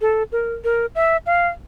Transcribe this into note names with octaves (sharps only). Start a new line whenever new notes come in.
A4
A#4
A#4
E5
F5